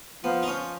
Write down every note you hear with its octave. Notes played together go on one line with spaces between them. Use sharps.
F3 B3
D#4
F3 C#4